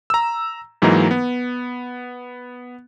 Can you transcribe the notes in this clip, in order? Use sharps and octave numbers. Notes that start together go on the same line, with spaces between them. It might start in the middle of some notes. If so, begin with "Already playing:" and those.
A#5 E6
G#2 E3 F#3 A#3 D#4
B3